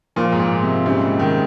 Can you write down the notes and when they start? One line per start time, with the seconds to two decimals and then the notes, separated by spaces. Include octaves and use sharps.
0.16 A#2 F3 A#3 F4 C5
0.32 G#2
0.39 A#2
0.63 C3
0.85 G#2 C#3 G3 C4
1.19 D#3